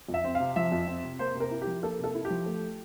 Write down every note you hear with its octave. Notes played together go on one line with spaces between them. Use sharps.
F2
E5
C4
F5
C3
F3 E5
F2
C4
C3
A#3 C5
C3
A#4
E4
G4
F3
A#3 A4
C3
A4
E4
G4
F3
A3